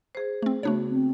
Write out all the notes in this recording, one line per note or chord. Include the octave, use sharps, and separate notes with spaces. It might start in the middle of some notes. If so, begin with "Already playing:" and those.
G#4 C5
A3 C4
C#3 A3 B3 D4 F#4 C#5
C4